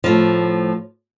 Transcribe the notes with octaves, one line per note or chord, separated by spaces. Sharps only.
A2 F3